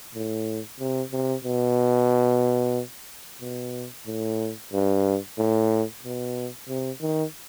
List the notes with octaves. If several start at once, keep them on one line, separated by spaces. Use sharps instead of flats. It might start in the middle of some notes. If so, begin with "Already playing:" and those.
A2
C3
C3
B2
B2
A2
G2
A2
B2
C3
D#3